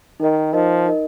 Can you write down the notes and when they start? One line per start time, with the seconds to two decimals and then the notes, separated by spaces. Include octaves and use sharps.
0.20 D#3 D#4 A#4 D#5
0.53 F3 D#4 A#4 D#5
0.85 D#4 A#4 D#5